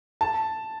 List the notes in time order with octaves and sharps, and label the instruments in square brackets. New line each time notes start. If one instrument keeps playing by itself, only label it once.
[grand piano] A5